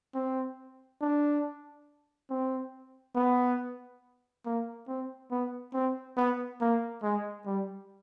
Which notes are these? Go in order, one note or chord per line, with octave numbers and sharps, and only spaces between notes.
C4
D4
C4
B3
A#3
C4
B3
C4
B3
A#3
G#3
G3